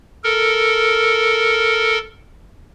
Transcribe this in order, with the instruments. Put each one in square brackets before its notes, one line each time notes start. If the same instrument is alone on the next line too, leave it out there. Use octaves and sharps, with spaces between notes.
[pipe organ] A4 A#4